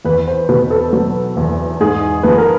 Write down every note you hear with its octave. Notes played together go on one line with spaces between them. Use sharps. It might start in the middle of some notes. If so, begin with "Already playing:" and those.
E2 B4
C5
B2 B4
A4
F#3
E2
G#2 G#4
F3 B4
A#4